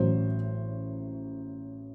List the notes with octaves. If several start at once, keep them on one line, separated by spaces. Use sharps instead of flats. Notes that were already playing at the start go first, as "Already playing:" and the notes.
Already playing: A1 A2 F#3 A3 C5